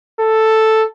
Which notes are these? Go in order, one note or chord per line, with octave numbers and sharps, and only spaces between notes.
A4